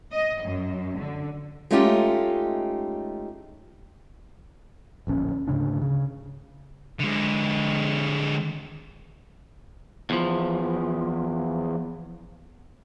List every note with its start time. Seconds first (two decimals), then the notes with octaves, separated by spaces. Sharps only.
0.12 D#5
0.43 F#2
1.00 D3
1.71 G#3 A3 C#4 D#4 F4 G4
5.07 D1 A#1 C#4
5.47 D2 G#2 C#3 D4
5.82 C#3
6.99 D3 G#3
10.10 E2 F3